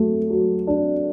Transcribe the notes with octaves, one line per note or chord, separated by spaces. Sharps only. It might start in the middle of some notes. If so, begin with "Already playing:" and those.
Already playing: F#3 A3
F#3
D4